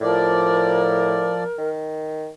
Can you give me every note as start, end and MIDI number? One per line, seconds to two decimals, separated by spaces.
0.01 1.39 45
0.01 1.44 53
0.01 1.69 70
0.01 1.44 74
1.58 2.29 51